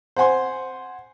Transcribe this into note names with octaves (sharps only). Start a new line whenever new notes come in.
C5 F#5 G#5 C6